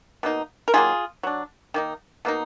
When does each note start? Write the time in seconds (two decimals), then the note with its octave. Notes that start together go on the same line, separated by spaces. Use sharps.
0.23 B2 A#3 D#4
0.68 A#4
0.74 D#3 F#3 A#3 F4 G#4
1.23 F#3 D4
1.74 D#3 A#3 D#4
2.25 B2 A#3 D#4